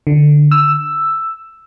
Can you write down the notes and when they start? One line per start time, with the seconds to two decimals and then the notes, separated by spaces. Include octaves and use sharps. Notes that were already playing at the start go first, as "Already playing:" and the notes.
0.07 D3
0.51 E6